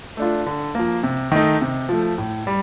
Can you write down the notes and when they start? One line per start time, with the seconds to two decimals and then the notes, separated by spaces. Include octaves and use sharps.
0.17 A3 D4 F4
0.46 D3
0.75 F3 A#3
1.03 C3
1.32 D#3 A3 D#4
1.61 C3
1.89 F3 A3
2.18 A2
2.47 G3